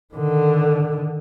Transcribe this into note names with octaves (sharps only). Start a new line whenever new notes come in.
D3 D#3